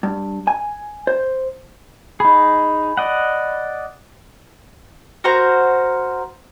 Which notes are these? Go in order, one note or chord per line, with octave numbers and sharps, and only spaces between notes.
G2
G#5
C5
D#4 G#4 B5
D5 D#5 F#5
F#4 A#4 C5 A#5